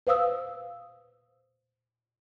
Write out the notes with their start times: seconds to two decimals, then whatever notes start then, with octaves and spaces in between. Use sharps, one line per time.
0.07 B4 C5 F5 D#6 E6